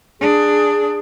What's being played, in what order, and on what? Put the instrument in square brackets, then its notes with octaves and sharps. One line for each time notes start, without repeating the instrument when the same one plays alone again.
[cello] D4 [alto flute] G#4